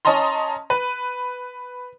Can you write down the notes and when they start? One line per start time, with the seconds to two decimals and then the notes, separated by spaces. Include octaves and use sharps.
0.05 C#4 D#5 A5 A#5 C6
0.70 B4